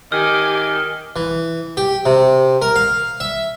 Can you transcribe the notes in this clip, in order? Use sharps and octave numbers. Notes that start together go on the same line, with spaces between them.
D#3 G4 G#5 D6 F6
E3
G4
C3
A#4
F5
E5